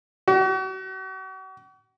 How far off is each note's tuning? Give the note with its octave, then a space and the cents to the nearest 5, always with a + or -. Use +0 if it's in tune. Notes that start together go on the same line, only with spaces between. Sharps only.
F#4 +40